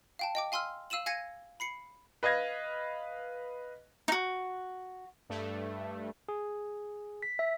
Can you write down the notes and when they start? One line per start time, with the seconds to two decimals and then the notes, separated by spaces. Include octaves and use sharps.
0.19 F5 G5 A5
0.35 D#5 G5 D6
0.52 F5 G#5 C6 E6 F6
0.90 F5 E6 D#7 E7 F#7
1.06 F5 G#5 G#6 A#6 C#7 D#7
1.60 B5 C7 C#7
2.23 B4 D#5 F5 G#6 A#6
4.08 D#4 F#4
5.29 G2 A3
6.29 G#4
7.23 B6
7.39 E5